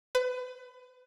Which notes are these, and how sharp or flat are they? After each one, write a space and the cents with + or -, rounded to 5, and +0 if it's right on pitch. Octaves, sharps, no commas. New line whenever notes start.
B4 +30